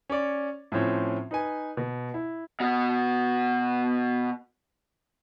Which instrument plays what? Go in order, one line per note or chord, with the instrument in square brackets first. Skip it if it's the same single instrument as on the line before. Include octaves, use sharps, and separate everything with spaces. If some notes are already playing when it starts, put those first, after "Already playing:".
[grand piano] C#4 C#5 D5
A2 F3 C4 C#4
D#4 B4 G#5
B2
E4
[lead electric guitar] B2 F#4